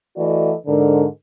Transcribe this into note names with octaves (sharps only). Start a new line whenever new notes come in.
E3 A3 F#4 A4 D5 D#5
G#2 D3 A#4